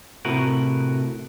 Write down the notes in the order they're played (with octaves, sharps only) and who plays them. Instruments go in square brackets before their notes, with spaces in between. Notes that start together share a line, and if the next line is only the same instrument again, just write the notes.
[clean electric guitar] A2 C3 F#4 A#4 B4